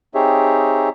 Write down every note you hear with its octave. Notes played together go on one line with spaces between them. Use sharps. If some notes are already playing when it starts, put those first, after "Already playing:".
C4 D#4 G4 G#4 C#5 E5